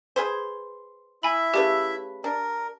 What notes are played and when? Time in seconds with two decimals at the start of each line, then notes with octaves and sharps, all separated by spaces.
0.16 G#4 B4 C5
1.23 E4 E5 G#5 B5
1.54 C#3 A3 G4 B4
2.24 D4 A#4